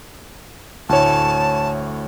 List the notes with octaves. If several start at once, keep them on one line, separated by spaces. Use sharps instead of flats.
D2 A2 C#5 A5